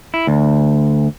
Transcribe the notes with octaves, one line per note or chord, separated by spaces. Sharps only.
E4
D2